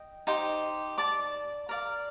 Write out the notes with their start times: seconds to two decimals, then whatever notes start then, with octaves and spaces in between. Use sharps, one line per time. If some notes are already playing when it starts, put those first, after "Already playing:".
Already playing: D#5 G5
0.27 D#4 G4 C5
0.98 D5 A5 D6
1.69 A#4 D5 F5